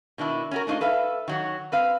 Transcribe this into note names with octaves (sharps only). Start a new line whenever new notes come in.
B2 D#3 D4 E4
C#4 F#4 A#4
A3 D4 D#4 F4 C5
A4 B4 E5 F5
D#3 F#3 F#4
C4 B4 F5